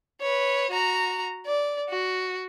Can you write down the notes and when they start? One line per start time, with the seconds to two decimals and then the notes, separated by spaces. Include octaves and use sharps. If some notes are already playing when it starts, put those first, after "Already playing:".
0.20 B4 C#5
0.70 F#4 A#5
1.46 D5
1.90 F#4